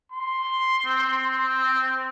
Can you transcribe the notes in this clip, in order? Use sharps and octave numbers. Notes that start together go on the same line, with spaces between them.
C6
C4